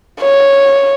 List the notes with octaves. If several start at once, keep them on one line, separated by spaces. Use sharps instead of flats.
C#5